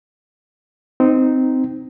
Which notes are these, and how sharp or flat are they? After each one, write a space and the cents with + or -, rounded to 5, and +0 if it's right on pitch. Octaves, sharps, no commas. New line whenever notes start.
C4 -15 D#4 +0